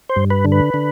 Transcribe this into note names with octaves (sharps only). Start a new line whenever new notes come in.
C5
G2
B4
D3
B4
D3